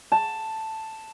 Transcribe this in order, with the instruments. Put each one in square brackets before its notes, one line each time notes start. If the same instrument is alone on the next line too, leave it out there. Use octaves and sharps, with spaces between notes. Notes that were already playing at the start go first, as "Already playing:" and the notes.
[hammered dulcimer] A5